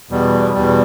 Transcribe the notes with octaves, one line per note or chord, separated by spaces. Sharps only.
E2 B2 G3
E2 B2 G3